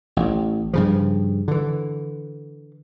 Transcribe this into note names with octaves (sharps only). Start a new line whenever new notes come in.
A1
G2 C#3 F3
D3 E3